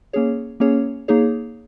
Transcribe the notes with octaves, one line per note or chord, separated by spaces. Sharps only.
A#3 C#4 G#4 C#5
A#3 C#4 G#4 C#5
A#3 D#4 G#4 C#5